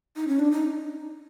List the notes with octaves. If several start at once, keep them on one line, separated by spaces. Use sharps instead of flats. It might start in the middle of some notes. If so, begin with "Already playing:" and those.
D#4
C#4
D4
D#4